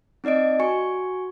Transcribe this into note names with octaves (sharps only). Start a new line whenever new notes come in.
C4 D#4 D5 D#5 D7
F#4 G#5 C#6 C#7